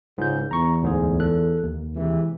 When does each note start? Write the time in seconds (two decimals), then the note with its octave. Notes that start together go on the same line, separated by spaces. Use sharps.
0.18 C#2 G#2 G6
0.51 E2 A#5 C#6
0.83 D2 G#2 G#4
1.20 A4 F#6
1.63 D#2
1.95 C3 E3 G#3